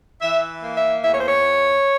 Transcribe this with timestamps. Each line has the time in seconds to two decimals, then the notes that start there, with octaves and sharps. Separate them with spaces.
0.20 E3 E5
0.61 A#3
0.75 E5
1.02 E2 E5
1.11 C#5
1.19 C5
1.26 C#5